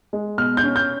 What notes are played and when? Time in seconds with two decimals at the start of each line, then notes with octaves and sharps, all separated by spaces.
0.13 G#3
0.38 B2 F6
0.57 G6
0.64 C#4
0.76 G6